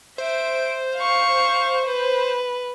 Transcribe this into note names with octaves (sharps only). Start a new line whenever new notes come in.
C5 E5 D7
F5 C#6
B4